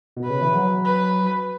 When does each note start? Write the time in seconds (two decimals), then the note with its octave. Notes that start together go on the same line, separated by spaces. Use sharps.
0.16 B2
0.24 B4
0.30 C#3
0.41 E3
0.54 F#3
0.85 B4